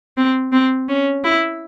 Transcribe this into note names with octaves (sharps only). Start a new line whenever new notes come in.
C4
C4
C#4
E4